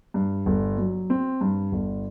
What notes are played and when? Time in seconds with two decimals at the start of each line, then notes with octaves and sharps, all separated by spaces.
0.14 G2
0.46 G1
0.78 F#3
1.10 C4
1.41 G2
1.72 G1